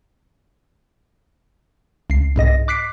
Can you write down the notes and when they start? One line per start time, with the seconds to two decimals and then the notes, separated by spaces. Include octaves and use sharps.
2.10 C#2 C7
2.36 C2 G#2 D#5 A#6
2.68 D6 F#6 B6 C7 D7